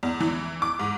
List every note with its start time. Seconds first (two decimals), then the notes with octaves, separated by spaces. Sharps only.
0.03 E2
0.20 E3
0.62 D6
0.79 G#2